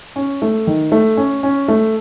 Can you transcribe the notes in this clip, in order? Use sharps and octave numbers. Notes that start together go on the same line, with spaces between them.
C#4
A3
D#3
A3
C#4
C#4
A3